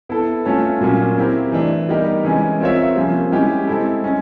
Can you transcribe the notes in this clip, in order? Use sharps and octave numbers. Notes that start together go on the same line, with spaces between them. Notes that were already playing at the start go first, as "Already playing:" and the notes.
B3 E4 A4
A3 C#4 F4 A4 C#5
A#2 F#3 A#3 C#4
C4 E4 G4 A#4
E3 A3 D4
G3 B3 D#4 G4 A#4
E3 G#3 C#4
C4 F4 A#4 C#5 E5
C3 F3 A#3 C#4
G#3 C#4 E4 G4
G#3 C4 E4 A4
G#3 C#4